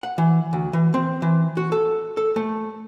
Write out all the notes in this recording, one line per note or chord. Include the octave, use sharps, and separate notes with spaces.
F#5
E3
D2
E3
C4
E3
F#4
A4
A4
A3